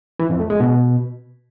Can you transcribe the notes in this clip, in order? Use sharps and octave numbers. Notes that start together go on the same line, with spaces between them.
E3
F2
A3
G#3
B2